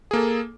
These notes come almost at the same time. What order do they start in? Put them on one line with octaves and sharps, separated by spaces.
G#4 A#3 A4